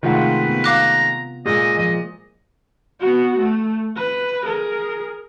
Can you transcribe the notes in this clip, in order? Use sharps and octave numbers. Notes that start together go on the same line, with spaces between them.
C3 D#3 G#3 A3 F4 B4 F#5
B3
F5 A#5 D6 F#6
A#2 G#3 G#4 D#5
F3 D#5
B3 F#4
A3
B4
G#4 A#4